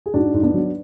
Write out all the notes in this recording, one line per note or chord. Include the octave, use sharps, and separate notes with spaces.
G#4
G#2 D4 F#4
G#2
B3 D4
F#3